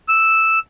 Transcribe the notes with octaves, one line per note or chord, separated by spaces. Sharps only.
E6